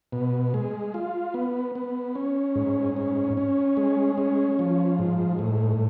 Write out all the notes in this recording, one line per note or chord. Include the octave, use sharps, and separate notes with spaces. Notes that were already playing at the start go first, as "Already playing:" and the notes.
B2
G#3
F4
B3
B3
C#4
G#2
C#4
C#4
G#3
C#4
F3
G#2
A2